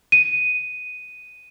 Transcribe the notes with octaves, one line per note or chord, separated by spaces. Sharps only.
D#7